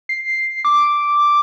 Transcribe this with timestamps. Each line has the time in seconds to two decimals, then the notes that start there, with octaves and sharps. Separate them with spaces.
0.09 C7
0.65 D6